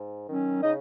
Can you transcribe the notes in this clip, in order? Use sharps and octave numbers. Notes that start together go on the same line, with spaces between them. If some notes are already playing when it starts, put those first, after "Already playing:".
Already playing: G#2
D#3 F#3 C#4
C#3 D#4 D#5